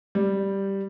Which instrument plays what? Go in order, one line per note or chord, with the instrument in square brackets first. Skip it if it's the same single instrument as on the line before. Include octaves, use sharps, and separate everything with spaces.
[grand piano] G3